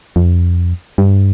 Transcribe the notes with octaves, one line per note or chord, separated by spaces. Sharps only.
F2
G2